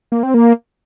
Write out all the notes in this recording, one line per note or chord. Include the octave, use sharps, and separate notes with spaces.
A#3
C4
A#3